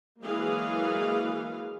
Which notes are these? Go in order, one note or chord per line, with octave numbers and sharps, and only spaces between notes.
E3 F#3 G#3 A#3 G#4 F5